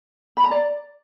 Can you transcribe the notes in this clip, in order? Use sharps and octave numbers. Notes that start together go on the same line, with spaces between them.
B5
A#5
D5